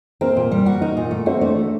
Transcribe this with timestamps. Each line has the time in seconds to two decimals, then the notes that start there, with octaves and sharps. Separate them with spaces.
0.21 A#3 C4 A#4
0.37 A#2
0.52 G3
0.66 F#4
0.81 A#3 D#4 A#4
0.97 A#2
1.11 A3
1.26 C4 F#4 C5
1.41 A3 D4 D5